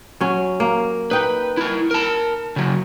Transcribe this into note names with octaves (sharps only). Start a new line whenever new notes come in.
F#3 C#4
A#3
D#4 B4 G5
E4 A#4
A#4 A5
C#3 F#3